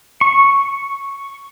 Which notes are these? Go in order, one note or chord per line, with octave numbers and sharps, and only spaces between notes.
C#6